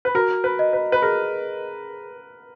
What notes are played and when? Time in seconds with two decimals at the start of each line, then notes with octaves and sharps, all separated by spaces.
0.05 B4
0.15 F#4 A#4
0.44 B4
0.59 D#5
0.73 B4
0.92 B4
1.02 G#4 A#4